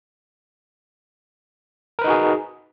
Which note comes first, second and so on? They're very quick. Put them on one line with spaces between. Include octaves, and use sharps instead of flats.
A#4 B4 D#4 F#4 G#4